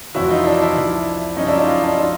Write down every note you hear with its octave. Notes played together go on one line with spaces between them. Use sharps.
F2 C3 E3 E4 F#4
D#4 F4
D4 E4
D4 E4
C2 C3 F3
F#2 C#3 F3 C#4 D#4
D4 E4
D#4 F4
D#4 F4
D4 E4
F3 D#4 F4